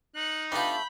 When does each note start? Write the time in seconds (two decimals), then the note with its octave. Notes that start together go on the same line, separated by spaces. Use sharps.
0.16 D#4 F#6 C#7
0.52 G3 A3 B3 D4 F4 B5 G6